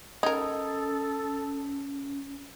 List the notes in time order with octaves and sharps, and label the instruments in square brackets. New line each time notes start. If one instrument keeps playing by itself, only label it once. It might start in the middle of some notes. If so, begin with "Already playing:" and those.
[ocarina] C#4 [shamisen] D#4 A#4 [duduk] A4 [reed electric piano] D#6 G#6